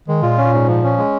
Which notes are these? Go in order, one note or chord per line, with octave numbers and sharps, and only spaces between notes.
D#3 G#3
A#2 F4
C#4
G#2
F3
C#4
G#3